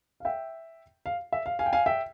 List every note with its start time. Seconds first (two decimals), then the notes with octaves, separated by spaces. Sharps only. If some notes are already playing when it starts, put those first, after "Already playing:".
0.20 F5
0.25 E5 G5
1.06 F5
1.32 E5
1.46 F5
1.59 F5 G#5
1.66 G5
1.73 F5 G#5
1.86 E5 G5